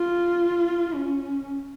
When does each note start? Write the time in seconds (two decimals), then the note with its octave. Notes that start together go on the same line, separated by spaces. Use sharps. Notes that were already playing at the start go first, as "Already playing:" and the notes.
Already playing: F4
0.94 C#4